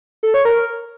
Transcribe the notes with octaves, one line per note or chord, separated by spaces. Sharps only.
A4
C#5
A#4